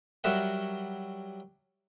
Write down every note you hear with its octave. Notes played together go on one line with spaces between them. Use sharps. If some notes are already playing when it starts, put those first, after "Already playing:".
F#3 G3 A#4 E5 F#5